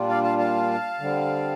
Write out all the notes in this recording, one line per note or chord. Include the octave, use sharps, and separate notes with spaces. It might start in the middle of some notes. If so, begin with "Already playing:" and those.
Already playing: A#2 G3 D4 F4
D5 F5
F5 A5
F5 A5
D3 G3 C4